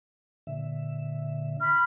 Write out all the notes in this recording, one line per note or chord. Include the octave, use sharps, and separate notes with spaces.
A#2 D3 E5
B5 F6